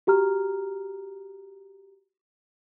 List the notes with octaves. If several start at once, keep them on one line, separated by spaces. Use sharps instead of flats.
F#4 G4 A#5 F6